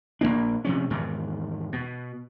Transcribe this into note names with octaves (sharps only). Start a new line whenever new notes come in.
A#1 G#2 A#3 D4
C3 F3 C#4
E2 G#2 D#3
B2